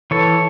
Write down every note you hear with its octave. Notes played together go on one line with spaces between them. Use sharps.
E3 A4 C#5